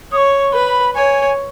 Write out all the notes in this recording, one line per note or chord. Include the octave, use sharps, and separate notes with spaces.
C#5 D#6
C#6
B4 B5
C#5 G#5